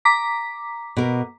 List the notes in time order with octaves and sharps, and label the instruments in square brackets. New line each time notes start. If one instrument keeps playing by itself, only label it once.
[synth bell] A#5 D6 B6
[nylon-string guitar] B2 A#4